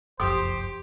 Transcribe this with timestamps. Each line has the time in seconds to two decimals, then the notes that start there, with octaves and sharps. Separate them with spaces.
0.20 F#1 C2 F2 G4 C5 D#6